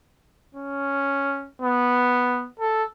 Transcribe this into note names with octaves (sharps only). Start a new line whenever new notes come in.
C#4
B3
A4